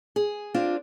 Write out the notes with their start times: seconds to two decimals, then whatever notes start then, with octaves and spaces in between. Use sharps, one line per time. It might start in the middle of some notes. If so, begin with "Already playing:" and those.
0.16 G#4
0.54 C4 D4 F4 D5